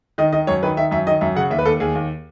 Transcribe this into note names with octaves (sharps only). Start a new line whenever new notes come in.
D#3 D#5
D#3 D#5
F#2 C#5
D#3 B4
D#3 E5
F#2 E5
D#3 D#5
F#2 E5
C#3 F#5
D#2 E5
B4
D#2 A4
D#2 G#4
D#2